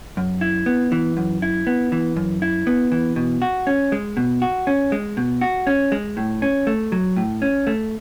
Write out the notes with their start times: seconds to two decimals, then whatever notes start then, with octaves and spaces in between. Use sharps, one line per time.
0.17 F#2
0.41 E4
0.66 B3
0.92 E3
1.17 F#2
1.42 E4
1.67 B3
1.92 E3
2.17 F#2
2.42 E4
2.67 B3
2.92 E3
3.16 B2
3.42 F#4
3.67 C#4
3.92 G#3
4.17 B2
4.42 F#4
4.67 C#4
4.92 G#3
5.17 B2
5.41 F#4
5.67 C#4
5.92 G#3
6.17 A2
6.42 C#4
6.67 A3
6.92 F#3
7.17 A2
7.42 C#4
7.67 A3